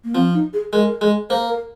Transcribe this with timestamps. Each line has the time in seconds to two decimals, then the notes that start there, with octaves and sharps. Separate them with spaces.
0.04 A#3
0.15 F3 C4
0.34 D#4
0.53 G#4
0.73 G#3 A#4
1.01 G#3
1.30 A#3 C5
1.49 A#4